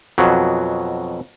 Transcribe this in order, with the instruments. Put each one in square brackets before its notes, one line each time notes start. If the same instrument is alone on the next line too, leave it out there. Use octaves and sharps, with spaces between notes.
[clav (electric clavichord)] F2 B2 F#3